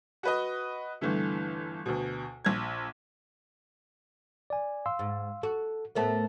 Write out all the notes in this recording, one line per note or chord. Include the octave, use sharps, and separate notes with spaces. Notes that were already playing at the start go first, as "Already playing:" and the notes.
F#4 B4 D#5
G1 D3 E3 A3
D2 B2
A#1 G#6
D5 G#5
F5 C6 E6
G#2
F#4 A4
A2 A3 B3 A#4 C5 A5